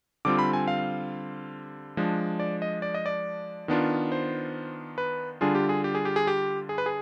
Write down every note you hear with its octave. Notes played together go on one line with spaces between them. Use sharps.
D3 G3 C4 F4 D6
B5
G#5
F5
F3 G#3 D4
D5
D#5
D5
D#5
D5
D#3 B3 D4 F4
C5
B4
D3 G3 D4 F4 G#4
G4
G#4
G4
G#4
G4
G#4
G4
G#4
B4
G#4